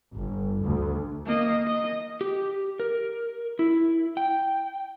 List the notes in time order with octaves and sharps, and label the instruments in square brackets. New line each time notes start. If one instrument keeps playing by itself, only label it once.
[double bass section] G1
D2
[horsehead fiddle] A#3 D#5
D#5
[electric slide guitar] G4
A#4
E4
G5